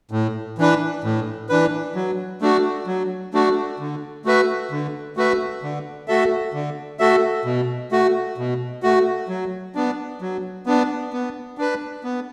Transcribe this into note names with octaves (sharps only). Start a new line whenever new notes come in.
A2
E3 D4 B4
A2
E3 D4 B4
F#3
A3 D4 F#4
F#3
A3 D4 F#4
D3
A3 F#4 B4 E5
D3
A3 F#4 B4 E5
D3
A3 F#4 A4 E5
D3
A3 F#4 A4 E5
B2
A3 F#4
B2
A3 F#4
F#3
B3 D4
F#3
B3 D4
B3
D4 B4
B3